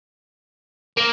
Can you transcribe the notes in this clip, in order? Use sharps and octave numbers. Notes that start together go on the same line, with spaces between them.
A#3